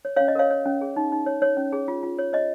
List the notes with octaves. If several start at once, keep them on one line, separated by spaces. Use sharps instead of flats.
C#5
C#5 F5
C#4
D#5
A#4 C#5 F5
C#5
C#4
G#4
D#4
D#4
C#5
C#5
C#4
G#4
F4
F4
C#5
C#5 D#5